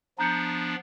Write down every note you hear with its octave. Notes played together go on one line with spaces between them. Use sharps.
F3 B3 D4 A#5 G6 C#7